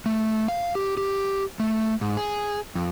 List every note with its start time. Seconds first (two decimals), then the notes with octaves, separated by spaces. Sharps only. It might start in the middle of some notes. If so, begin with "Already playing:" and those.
0.06 A3
0.48 F5
0.75 G4
0.97 G4
1.60 A3
2.01 G#2
2.17 G#4
2.75 F2